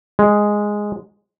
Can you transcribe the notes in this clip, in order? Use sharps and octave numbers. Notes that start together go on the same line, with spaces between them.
G#3